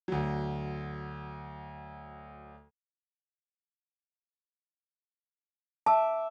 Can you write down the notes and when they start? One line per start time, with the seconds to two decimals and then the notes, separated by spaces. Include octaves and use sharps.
0.08 D2 F#3
5.86 E5 A5 D6